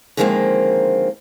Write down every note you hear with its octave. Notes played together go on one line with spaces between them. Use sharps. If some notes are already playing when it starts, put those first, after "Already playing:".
D3 D#3 F3 G#3 A#3 C4